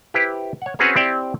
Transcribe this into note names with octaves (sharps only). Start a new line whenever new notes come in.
E4 G4 B4 C5
C#5 F#5
C4 C#4 F#4 G#4 B4 C#5
C4 E4 G4 D5 E5 G5